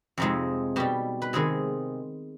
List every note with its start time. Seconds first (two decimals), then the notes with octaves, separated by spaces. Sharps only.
0.18 F2 C3 F3 G#3 D#4
0.76 B2 G3 G4
1.22 B4
1.33 C3 D#3 G#3 G#4